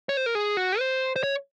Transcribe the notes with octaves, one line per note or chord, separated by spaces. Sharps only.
C#5
C5
A#4
G#4
F#4
C5
C5
C#5